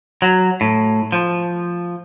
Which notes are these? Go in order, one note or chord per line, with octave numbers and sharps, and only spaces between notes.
F#3
A2
F3